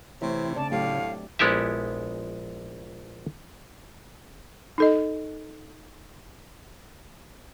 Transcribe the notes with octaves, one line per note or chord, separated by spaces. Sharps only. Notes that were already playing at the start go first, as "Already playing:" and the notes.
C3 E3 A3 C4 E4 C#5
C#3 C4 D4 D5 A5
A2 F#3 A3 G4 F5
A#1 G#3 B3 E4 G4 E5
D#4 A4 D#5